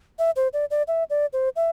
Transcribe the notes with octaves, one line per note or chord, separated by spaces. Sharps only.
E5
C5
D5
D5
E5
D5
C5
E5